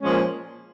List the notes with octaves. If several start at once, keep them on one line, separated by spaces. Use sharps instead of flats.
A#2 F3 G#3 C#4